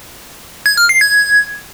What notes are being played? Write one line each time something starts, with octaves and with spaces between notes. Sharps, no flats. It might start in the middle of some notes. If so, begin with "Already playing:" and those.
G#6
F6
C7
G#6